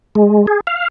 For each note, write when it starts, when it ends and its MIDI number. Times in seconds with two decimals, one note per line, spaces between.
0.15 0.46 56
0.47 0.60 68
0.67 0.88 77